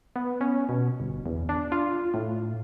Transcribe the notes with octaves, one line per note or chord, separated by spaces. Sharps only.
B3
C#4
B2
G1
E2
D4
F4
A2